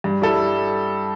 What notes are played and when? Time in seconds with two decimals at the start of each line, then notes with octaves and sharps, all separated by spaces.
0.04 G2
0.22 G3 E4 A4